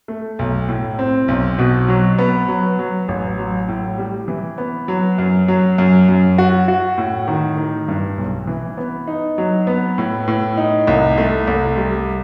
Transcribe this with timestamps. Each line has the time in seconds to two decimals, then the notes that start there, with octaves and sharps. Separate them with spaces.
0.08 A3
0.39 B1
0.69 A2
0.99 C4
1.28 B1
1.59 B2
1.88 F#3
2.18 B3
2.48 F#3
2.79 F#3
3.08 A1
3.38 F#3
3.68 A2
3.98 G3
4.28 E3
4.58 B3
4.88 F#3
5.18 F#2
5.48 F#3
5.78 F#2
6.09 F#2
6.38 F#4
6.68 F#4
6.98 A2
7.28 D#3
7.58 D#3
7.88 G2
8.18 B1
8.47 E3
8.77 B3
9.07 D#4
9.38 F#3
9.67 B3
9.98 A2
10.28 A2
10.57 D#4
10.87 C2
11.18 A3
11.47 C2
11.77 G3